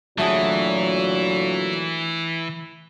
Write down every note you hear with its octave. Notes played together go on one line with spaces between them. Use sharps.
A#2 D3 E3 F#3 A3 F#4 G#4